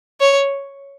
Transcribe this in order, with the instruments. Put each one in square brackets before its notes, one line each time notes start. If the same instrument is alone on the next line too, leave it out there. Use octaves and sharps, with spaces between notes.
[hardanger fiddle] C#5